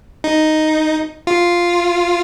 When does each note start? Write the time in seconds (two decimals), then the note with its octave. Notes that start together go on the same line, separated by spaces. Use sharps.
0.24 D#4
1.27 F4